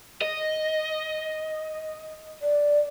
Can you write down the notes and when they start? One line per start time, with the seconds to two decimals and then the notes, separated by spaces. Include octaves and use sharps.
0.22 D#5
2.42 D5